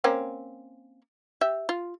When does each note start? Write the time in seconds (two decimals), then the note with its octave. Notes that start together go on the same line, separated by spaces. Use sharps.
0.04 A#3 C4 C#4
1.41 G4 E5
1.69 F4